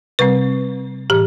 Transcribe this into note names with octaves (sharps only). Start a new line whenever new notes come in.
C3 G3 C4 B4
A2 E3 G4